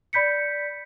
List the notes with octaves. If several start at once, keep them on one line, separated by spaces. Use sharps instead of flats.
D5 B5 G6 B6 C#7